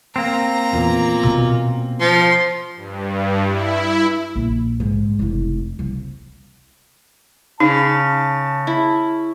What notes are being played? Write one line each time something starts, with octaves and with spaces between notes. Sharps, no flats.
A#3 C4 A#5
E2 A#2
B2 C#4
F3 C6
G2
E4
A#1
G#2
F1 E4
C2
C#3 D#4 A5
E4